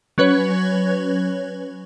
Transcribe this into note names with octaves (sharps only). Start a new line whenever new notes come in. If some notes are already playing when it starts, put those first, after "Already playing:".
F#3 C#4 B4 C#5